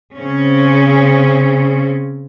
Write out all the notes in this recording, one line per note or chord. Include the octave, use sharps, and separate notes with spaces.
C#3 C4 C#4